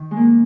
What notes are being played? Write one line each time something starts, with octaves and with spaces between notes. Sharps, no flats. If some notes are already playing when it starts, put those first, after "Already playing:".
Already playing: D#3
G#3
A#3